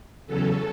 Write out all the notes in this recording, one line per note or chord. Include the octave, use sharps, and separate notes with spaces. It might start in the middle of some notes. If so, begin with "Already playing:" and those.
E2 C#3 F#3 C#4 A4